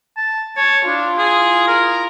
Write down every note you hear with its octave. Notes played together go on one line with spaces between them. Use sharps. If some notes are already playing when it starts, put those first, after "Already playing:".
A5
C#5 A5
D4 E4 F4
G#4
A#4